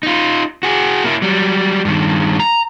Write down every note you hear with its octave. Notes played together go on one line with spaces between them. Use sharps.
D#4 F4
F#4 G#4
A#3 E4
F#3 G3
G2 D#3
A#5